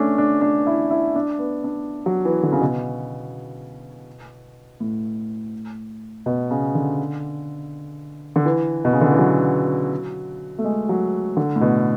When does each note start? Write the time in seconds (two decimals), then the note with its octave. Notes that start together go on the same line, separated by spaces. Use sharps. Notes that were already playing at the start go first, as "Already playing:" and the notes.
Already playing: A3 C#4 D4
0.18 D4
0.41 D4
0.67 E4
0.91 E4
1.15 D4
1.39 B3
1.64 D4
2.06 F#3
2.25 E3
2.43 D3
2.52 C#3
2.61 B2
4.80 A2
6.26 B2
6.51 C#3
6.75 D3
8.36 D3
8.45 E3
8.85 B2
8.93 C#3
9.01 D3
9.11 E3
9.19 F#3
10.58 A3
10.64 G#3
10.89 F#3
11.37 D3
11.56 A2
11.61 B2